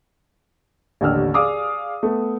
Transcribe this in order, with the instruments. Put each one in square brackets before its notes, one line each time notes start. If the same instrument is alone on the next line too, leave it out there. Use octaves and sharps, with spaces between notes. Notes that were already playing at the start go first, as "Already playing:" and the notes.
[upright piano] A1 D#2 D3 G4 E6 F6
G#4 D5 F5 D6 D#6
A3 B3